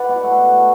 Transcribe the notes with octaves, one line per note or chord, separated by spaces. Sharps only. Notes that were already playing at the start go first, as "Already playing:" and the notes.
Already playing: B4 D5 F#5
B2
A3
B2
A3